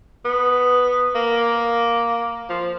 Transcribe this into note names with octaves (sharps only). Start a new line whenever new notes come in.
B3
A#3
F3